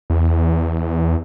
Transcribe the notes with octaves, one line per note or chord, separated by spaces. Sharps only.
E2